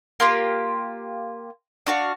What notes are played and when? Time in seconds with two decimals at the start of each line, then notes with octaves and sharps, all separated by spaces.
0.20 A#3 F4 G4
1.86 D4 F#4 F5